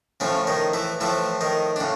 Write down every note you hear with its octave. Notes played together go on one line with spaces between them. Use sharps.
A2 C#3 F3 C#4
D#3 D#4
E3 E4
A2 E3 F3 E4
D#3 D#4
D4
A2 C#3